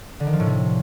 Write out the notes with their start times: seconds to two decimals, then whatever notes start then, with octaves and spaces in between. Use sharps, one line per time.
0.20 D3
0.27 D#3
0.33 F3
0.40 A2
0.46 C3